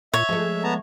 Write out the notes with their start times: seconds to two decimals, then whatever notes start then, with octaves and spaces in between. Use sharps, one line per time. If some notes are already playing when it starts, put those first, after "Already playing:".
0.14 A#2 C#5 E5
0.29 F3 G#3 A3
0.64 B3 A5 A#5